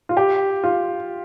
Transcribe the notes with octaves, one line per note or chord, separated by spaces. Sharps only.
F4
G4
F4